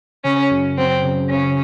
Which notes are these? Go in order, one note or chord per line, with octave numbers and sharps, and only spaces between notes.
C#3 C#4
F#2
F#3 C4
C#3
C#3 C#4